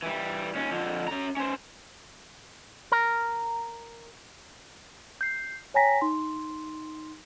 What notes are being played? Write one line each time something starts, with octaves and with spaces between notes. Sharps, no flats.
E3 G3
D#2 C#4
F2 D3
C#4 A#5
C#4 C5
A#4
G6 C7
C#5 G5 G#5 A#5 A#6 B6
D#4 C6